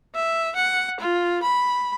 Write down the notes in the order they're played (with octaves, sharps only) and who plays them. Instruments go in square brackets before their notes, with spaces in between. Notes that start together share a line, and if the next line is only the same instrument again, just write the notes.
[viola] E5
F#5
F4
B5